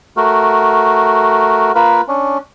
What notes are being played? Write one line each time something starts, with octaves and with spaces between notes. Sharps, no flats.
A3 F#4 A#4
A#3 F4 A#4 B4
C#4 D4